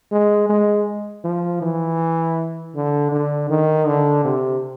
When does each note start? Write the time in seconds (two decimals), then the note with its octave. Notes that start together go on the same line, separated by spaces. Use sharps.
0.12 G#3
0.49 G#3
1.24 F3
1.62 E3
2.75 D3
3.12 D3
3.50 D#3
3.87 D3
4.25 C3